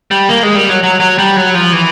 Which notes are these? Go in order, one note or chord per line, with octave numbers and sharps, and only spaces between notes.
G3
A#3
G#3
G3
F#3
F#3
F#3
G3
F#3
F3
E3